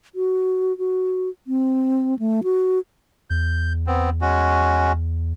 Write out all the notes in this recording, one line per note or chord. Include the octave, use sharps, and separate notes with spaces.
F#4
F#4
C4
A3
F#4
E2 G6
B3 C4
G#3 C#4 F#4